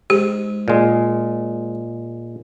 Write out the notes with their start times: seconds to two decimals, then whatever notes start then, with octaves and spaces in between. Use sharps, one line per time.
0.10 G#2 G4
0.68 A#2 G#3